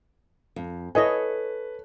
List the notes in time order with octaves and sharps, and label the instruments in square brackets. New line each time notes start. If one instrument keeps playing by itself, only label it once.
[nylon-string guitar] F2
[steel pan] E4 D#5 G#5 [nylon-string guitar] A4 C#5 [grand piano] B4